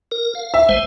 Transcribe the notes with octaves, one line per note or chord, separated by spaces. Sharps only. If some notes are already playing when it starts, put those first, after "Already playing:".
A#4
F5
E5
A1 G#3 C5